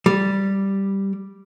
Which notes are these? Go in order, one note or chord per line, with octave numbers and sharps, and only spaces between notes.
G3